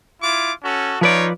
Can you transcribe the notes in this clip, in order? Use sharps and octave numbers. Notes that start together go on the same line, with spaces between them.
E4 F4 D6
C#4 F#4 A4
F3 D#4 F4 B4 C#5 D5